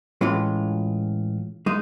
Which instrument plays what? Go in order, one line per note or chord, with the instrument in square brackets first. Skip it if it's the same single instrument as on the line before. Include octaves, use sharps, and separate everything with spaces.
[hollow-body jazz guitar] A2 E3 G#3 C#4 F4
G#3 D#4